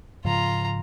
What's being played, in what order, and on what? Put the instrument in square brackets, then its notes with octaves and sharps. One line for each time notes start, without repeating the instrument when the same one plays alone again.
[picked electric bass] G#2 C#3 F3 [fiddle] F4 A#5